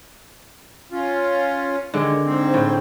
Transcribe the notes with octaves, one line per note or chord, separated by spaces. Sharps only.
C#4 F4
D3 D#3 G#3
G#2 C4
A2